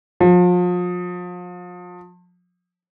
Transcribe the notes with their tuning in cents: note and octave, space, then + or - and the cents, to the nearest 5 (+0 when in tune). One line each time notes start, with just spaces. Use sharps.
F3 +35